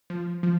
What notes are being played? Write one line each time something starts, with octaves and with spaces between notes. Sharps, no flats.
F3
F3